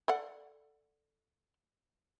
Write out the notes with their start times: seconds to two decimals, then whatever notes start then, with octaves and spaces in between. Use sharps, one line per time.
0.08 A4 D5 F#5